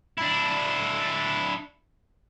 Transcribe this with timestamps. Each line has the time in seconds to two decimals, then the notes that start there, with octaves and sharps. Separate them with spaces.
0.18 D4 E4